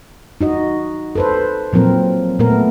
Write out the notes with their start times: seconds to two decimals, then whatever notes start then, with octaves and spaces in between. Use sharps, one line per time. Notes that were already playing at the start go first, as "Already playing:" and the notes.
0.41 D#4 F#4 D#5
1.15 A4 B4 C5
1.73 A#2 F3 F#3 C4 A#4
2.39 A#2 A3 B3 A#4